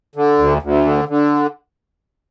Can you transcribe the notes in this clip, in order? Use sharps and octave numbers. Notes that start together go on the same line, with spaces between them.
D3
D2
D2
D3
D3